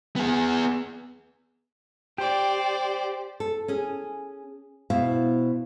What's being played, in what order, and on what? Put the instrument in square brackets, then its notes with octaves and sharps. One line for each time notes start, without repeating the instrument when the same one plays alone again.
[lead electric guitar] B3 G#4
[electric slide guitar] G4 [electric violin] C5 D5
[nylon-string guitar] A4
C#4 G#4
B2 E4 C5 E5 F5